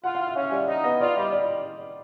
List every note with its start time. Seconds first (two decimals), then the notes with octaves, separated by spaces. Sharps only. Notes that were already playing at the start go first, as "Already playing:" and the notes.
0.04 F4 F#5
0.15 F4 F5
0.27 E5
0.36 C#4 F5
0.52 G3 E5
0.68 D#4 D#5
0.84 B3 D#5
1.00 F4 D5
1.17 G3 D#5
1.32 D5